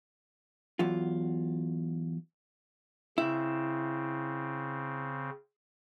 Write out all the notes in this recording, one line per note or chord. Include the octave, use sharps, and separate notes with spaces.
E2 F#3 F4
C#3 C4 E4